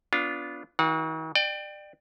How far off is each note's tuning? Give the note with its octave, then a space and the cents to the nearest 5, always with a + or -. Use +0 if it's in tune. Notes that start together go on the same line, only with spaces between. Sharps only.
B3 +0 D4 -20 F4 +0
D#3 +45 F#4 -15 F#5 -35
D5 +30 G5 +0